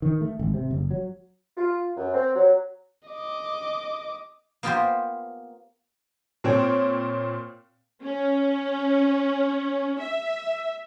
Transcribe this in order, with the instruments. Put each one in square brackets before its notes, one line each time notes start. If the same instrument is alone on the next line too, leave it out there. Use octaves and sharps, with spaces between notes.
[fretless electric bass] D#3
A3
G#1
C3
F#1
F#3
[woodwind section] F4
F#2
C4
F#3
[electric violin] D#5 D6
[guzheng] A#3 B3 F4 G4 A#4 C5
[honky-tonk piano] A#2 C4 C#5 G5
[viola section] C#4
E5